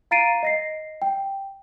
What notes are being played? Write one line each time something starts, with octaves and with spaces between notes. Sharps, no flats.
F5 A#5 A6 C7 D7 D#7
D#5 A#6 C7
G5